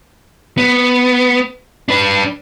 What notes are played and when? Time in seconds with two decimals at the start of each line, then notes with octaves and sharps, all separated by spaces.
0.58 B3
1.89 D4 B4